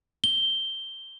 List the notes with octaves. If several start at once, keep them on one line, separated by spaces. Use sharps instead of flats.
G7